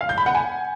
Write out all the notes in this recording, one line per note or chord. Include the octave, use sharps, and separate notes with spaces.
F5
G6
B5
F#5
G#5